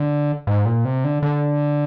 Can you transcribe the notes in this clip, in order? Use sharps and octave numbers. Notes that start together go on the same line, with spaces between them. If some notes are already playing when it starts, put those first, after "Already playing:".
Already playing: D3
G#2
A#2
C3
D3
D3